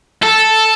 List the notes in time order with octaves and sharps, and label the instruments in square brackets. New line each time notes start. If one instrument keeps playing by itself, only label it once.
[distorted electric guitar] A4